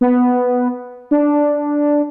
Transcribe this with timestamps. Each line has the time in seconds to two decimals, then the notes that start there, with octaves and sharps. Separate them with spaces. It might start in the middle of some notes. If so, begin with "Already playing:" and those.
0.01 B3
1.11 D4